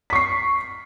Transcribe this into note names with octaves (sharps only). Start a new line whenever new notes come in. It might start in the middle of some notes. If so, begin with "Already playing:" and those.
C#6 B6 C7